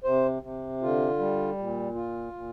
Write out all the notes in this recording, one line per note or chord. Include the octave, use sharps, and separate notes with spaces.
C3 C5
C3
D3 F4
G3
A#2
F4
A#2